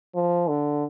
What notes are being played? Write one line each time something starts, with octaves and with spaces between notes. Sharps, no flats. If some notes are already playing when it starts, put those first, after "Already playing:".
F3
D3